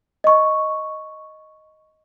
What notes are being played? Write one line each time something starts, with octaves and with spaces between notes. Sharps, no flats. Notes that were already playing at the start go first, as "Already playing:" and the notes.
D#5 C#6